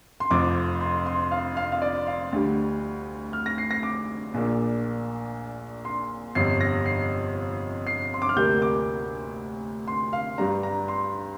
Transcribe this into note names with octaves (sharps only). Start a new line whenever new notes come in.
C6
F1 F2 F3 D6
C6
C6
F5
F5
F5
D5
F5
D2 D3 G3
F6
A#6
C7
A#6
D6
A#1 A#2 A#3 D4
C6
G1 F2 C3 C7
A#6
C7
C7
C6
D6
F6
D2 C3 G3 A#3 G6
D6
C6
F5
G2 G3 D4 A#5
A#5
C6